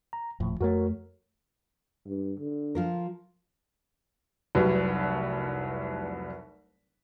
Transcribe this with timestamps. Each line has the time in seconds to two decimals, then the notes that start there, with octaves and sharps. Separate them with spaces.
0.13 A#5
0.40 D#1 A2 F3
0.61 F2 A3 F#4 A#4 C#5
2.06 G2
2.39 D3
2.75 F3 F4 A#4
4.55 F1 C2 F#3 G3 B4